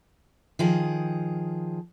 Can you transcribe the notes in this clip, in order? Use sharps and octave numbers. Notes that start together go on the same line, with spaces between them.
D#3 F3 G#4